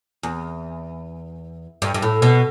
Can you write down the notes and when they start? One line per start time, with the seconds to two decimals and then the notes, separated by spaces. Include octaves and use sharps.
0.23 E2
1.82 G2
1.94 G2
2.02 A2
2.22 B2